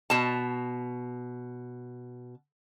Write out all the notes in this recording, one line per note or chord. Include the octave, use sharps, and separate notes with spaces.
B2 A5